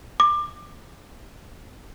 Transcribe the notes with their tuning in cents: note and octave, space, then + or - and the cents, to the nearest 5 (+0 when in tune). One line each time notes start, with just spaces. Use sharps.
D6 +20